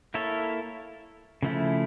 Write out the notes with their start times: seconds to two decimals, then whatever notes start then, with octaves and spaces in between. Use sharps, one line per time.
0.14 A#3 E4 A4 C#5
1.43 C#3 F3 A3 E4